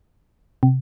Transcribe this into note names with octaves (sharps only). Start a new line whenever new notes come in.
C3